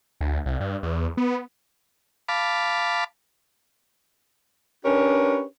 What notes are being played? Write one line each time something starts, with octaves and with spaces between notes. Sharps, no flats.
D2
C2
G2
E2
B3
F5 A5 B5 D6
C#4 D4 G4 A#4 B4 C#5